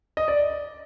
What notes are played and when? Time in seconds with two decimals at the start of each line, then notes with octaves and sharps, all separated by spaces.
0.17 D#5
0.28 D5